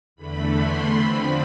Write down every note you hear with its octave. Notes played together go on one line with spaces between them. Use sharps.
E2 D3 A3 B5
C6
D3 F3 C4 B5